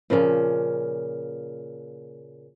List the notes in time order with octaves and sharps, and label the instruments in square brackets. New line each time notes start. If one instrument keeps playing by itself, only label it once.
[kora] A#2 C#3 F3 A#3